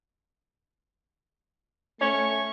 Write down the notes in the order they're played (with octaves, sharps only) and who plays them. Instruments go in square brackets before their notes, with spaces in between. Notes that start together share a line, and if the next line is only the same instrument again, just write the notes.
[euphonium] A3 [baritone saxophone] C#4 [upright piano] C#5 [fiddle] C#6